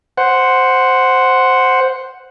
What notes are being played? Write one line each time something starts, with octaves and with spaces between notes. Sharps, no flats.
C5 F#5